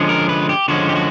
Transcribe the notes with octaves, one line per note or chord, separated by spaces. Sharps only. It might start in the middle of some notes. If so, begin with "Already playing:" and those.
Already playing: D3 F3 G#3 C#4
A#4
B4
G4
D3 F3 G#3 C#4 F#4
G4
F#4